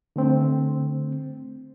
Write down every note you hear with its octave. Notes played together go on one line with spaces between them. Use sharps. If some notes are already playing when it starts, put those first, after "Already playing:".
D3 A3 C4